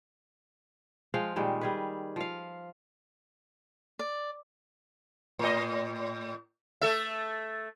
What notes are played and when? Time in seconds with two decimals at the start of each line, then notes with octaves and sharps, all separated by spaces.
1.14 F3 G#3 F5 G5
1.36 A#2 D#3 G3 G#3
1.61 G3 G#4 B4
2.16 F3 F5
3.99 D5
5.39 A2 D#5
6.81 A3 A4 E5